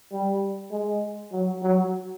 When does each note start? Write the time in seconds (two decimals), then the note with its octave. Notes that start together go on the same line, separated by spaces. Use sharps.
0.12 G3
0.71 G#3
1.32 F#3
1.63 F#3